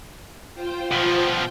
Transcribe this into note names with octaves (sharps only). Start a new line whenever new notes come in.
F4 C5 G5
B2 F3